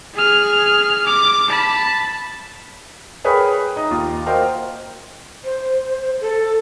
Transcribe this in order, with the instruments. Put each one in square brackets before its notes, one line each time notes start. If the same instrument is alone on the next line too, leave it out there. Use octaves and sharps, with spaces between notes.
[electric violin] G#4 F6
D6
A5 B5
[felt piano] G#4 A#4 B4 C#5 G5 B5
D#4 D#5
D#2 F4
F#4 A#4 C5 D#5 F5 G5
[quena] C5
A4